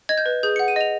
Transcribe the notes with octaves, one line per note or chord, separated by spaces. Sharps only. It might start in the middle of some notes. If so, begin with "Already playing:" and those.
D#5 G#6
G6
B4
G#4 G6
F#5 C#7
D#7
D#5 F7